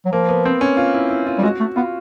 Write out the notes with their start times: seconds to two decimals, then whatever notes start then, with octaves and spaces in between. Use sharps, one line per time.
0.05 F#3
0.12 F3 A#3
0.29 B3
0.45 C4
0.61 C#4
0.77 F4
0.94 E4
1.10 E4
1.27 F4
1.38 G3
1.43 G#3 F#4
1.60 A3
1.76 B3 F4